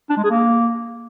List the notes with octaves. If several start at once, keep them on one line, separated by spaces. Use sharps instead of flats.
D4
G#3
G#4
A#3